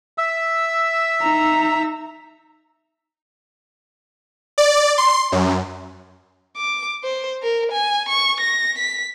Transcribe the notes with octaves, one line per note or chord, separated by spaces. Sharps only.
E5 E6
D#4 A#5
D5
C6
F#2
D6
C5
A#4
G#5
C#6
A#6
B6